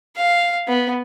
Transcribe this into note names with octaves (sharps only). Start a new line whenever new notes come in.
F5
B3